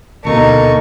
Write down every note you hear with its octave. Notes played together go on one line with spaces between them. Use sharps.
D#1 D2 B2 A#3 D#4 A4 C#6